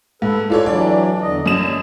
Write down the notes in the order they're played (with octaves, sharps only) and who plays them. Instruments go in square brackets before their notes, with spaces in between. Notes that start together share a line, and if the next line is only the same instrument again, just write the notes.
[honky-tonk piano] G#2 [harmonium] A4 B4
[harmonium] G#3 D5 [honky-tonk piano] F4 A4 C#5
[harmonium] E3 F#3 D4 [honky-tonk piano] D5
[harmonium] E2 D3 D#5
[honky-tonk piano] F#2 E7 [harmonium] D#5